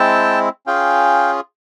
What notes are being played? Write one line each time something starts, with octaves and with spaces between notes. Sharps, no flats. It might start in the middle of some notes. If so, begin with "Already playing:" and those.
Already playing: G#3 C4 E4 G5 A5
C#4 F4 G#4 F5 G5